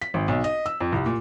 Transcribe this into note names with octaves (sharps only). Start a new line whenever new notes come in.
B6
G#1
B1
D#5
E6
F2
C2
A#2